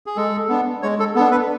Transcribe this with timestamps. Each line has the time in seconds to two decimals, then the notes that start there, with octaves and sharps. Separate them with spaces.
0.06 G#4
0.17 G#3 A4
0.49 B3 D4
0.83 G#3 C#5
0.99 A4
1.16 B3 A4
1.20 D4
1.31 B4